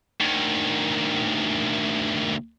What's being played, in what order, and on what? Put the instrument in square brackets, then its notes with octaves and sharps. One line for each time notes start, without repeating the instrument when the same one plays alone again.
[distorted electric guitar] D2 D#3